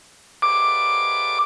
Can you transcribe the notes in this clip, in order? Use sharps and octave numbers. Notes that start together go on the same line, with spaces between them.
D6